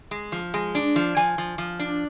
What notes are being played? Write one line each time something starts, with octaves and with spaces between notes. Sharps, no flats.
G#3
F3
G#3
D4
F3
F3 G#5
F3
F3
D4